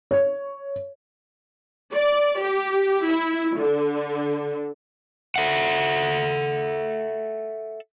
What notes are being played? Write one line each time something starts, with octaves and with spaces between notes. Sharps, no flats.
C#5
D5
G4
E4
D3
A4 E5 F#5